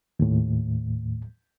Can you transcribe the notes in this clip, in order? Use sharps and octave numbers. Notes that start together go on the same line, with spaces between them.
D#2 A2